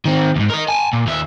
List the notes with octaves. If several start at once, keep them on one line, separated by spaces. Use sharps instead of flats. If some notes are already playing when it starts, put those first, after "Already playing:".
D#3 C4
D#2 G#2
A#4 D#5
G#5 A5
A#2
D#2 E5